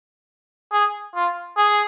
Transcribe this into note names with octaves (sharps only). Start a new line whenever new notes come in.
G#4
F4
G#4